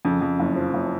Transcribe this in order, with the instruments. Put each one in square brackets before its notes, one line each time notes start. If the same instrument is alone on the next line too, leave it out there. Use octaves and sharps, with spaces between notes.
[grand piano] F2 [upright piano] C#3
[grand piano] F2
F#1
F3
F#1